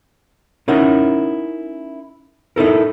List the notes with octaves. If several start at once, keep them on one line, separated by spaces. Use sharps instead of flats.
C#4 D#4 E4 A#4 F#5
D#4 E4 A4 A#4